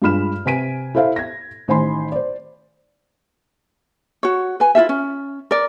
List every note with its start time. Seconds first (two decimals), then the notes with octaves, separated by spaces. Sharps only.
0.02 G2 G#3 F4 B5 F6 E7
0.46 C3 B4 G#5 B6 D7 D#7
0.95 E4 A4 C5 E5 F5
1.16 G#6 A#6
1.68 A1 D#3 C5 G#5 B5 C6
2.12 C5 D5
4.23 F#4 C#5
4.60 B4 G#5
4.75 E4 F4 G#4 E5
4.89 C#4
5.51 A#4 D5